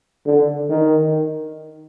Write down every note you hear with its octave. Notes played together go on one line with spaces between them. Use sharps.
D3
D#3